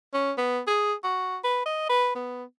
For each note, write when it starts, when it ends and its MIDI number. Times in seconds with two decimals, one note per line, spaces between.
0.14 0.33 61
0.38 0.61 59
0.68 0.94 68
1.04 1.38 66
1.44 1.66 71
1.66 1.85 75
1.90 2.13 71
2.16 2.44 59